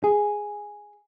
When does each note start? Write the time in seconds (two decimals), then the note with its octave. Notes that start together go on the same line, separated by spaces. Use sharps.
0.04 G#4